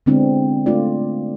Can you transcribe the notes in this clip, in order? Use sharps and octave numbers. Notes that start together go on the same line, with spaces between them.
D3 G#3 B3 C4 D4 E4
A3 D4 F4 D5